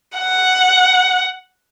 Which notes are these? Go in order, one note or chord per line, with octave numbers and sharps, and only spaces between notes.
F#5